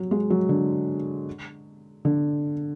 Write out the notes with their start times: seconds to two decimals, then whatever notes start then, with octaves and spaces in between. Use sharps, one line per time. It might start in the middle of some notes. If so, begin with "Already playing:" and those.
Already playing: F#3
0.11 G#3
0.30 F#3
0.49 D3
2.05 D3